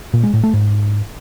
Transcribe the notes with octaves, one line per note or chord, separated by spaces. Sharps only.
A#2
G#3
A2
A3
G#2